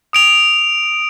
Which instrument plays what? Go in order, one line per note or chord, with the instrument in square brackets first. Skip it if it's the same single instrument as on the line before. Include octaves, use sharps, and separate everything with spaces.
[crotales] D#6 D7 F7